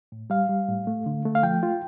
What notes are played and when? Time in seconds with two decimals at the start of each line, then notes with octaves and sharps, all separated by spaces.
0.12 A2
0.30 G3 F5
0.49 G3
0.69 A2
0.87 A3
1.06 D3
1.25 A3
1.35 F5
1.43 F3 G5
1.63 F4